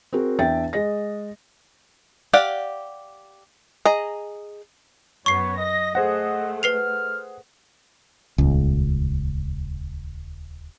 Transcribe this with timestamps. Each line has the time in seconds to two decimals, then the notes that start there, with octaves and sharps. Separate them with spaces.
0.13 C4 F#4 G#4 A#4
0.39 E2 D4 E5 G5 A6
0.73 G#3 D#5 A#6
2.33 G4 D5 F5 F#5
3.86 G#4 D#5 A#5
5.26 F#2 B3 C#5 C#6 C7
5.58 D#5 A#6
5.95 A3 G#4 C5 D#5 F#5
6.63 B4 F6 C7 F7
8.38 D#1 C#2